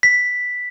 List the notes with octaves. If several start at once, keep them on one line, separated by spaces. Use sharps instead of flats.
B6